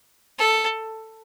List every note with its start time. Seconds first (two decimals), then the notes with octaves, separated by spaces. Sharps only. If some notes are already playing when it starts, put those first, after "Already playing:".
0.39 A4